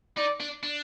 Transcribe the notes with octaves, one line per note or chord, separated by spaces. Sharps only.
D#4 D5
D4
D4